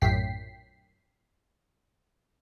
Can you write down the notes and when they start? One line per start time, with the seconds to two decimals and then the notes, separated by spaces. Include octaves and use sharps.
0.01 A#1 F#2 A2 G5 B6 C7